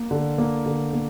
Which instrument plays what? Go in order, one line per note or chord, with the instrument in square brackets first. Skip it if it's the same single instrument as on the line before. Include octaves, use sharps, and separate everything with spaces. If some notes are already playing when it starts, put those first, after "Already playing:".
Already playing: [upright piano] A#3
D3
A#3
D3
A#3